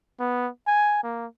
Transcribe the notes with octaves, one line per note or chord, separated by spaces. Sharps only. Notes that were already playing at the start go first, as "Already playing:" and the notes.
B3
G#5
A#3